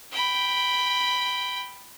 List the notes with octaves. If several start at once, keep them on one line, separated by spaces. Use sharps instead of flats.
G5 B5